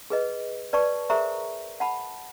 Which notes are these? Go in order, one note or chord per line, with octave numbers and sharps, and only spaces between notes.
G#4 B4 D#5
B4 D5 A5 C#6
G#4 A#4 C5 E5 A#5 C#6
F#5 A5 B5